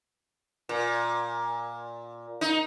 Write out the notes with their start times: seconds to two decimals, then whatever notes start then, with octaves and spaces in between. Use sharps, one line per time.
0.69 A#2
2.41 D#4